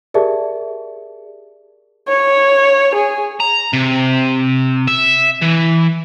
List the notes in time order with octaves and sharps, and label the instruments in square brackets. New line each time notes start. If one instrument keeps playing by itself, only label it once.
[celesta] G4 G#4 A#4 D5 E5 A5
[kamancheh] C#5
G#4
[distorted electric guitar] A#5
C3
E5
E3